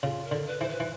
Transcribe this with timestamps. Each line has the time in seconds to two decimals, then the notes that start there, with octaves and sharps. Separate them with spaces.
0.02 C#3 F4
0.24 A#4
0.31 D3
0.46 B4
0.60 E3 C5
0.69 B4
0.80 E3